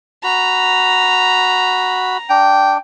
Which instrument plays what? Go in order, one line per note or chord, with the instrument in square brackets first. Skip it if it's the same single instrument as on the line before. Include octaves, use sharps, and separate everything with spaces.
[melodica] F#4 B5 [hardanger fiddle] A#5
[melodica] D4 [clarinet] G5